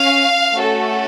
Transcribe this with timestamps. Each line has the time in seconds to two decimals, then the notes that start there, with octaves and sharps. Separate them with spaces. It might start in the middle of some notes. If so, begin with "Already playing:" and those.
Already playing: C#4 F5
0.55 A3 C#4 F#4 A4